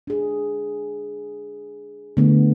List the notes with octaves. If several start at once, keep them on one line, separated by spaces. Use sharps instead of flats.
D4 G#4
D3 A3 B3